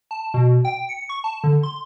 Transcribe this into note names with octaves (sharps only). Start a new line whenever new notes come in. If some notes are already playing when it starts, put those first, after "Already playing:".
A5
B2
G5
C#7
C#6
A5
D3
C6